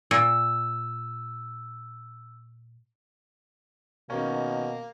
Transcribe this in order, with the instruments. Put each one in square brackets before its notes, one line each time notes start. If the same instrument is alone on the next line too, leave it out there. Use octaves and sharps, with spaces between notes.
[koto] A#2 [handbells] E6
[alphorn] B2 [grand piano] D#3 C#4 [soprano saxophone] A#3